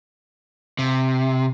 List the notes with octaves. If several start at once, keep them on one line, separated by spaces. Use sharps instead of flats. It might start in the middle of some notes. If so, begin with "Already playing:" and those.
C3